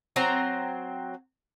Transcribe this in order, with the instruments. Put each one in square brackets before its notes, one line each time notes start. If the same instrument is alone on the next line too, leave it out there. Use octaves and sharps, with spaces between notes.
[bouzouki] F#3 C4 A#5